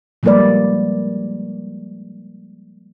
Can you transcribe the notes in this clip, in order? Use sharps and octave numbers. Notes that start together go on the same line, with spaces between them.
F3 G3 G#3 A#3 B4 D5